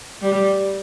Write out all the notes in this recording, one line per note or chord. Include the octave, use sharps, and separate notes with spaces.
G3